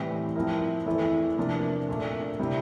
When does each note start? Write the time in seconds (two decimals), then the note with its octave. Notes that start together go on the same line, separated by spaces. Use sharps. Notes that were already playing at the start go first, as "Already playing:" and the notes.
Already playing: A2 E3 G3 C4
0.36 F3 C4 E4 A#4
0.86 E2 E3 A3 E4 A4
1.37 C3 F3 A#3 D4
1.88 A#2 A3 D4
2.39 C3 G3 C4 E4